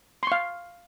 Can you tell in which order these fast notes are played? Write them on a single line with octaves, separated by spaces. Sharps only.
C6 C#6 F5